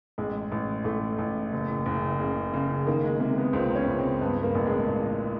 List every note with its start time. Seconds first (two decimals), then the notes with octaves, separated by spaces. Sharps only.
0.18 A1 G#3
0.52 A1
0.84 A1 A3
1.18 A1
1.52 F#1
1.86 F#1
2.20 C#3
2.54 C#3
2.86 D#3 A#3
3.04 G#3
3.20 C3 A#3
3.37 B3
3.53 C#2 C4
3.76 C#4
3.87 C#2
3.99 C4
4.21 G2 B3
4.43 A#3
4.55 A1
4.66 G#3
4.88 A1